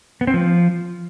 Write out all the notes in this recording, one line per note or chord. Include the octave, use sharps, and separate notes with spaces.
B3
C4
F3